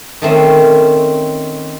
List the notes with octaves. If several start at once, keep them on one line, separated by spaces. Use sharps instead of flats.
D#3 A3 C4 C#4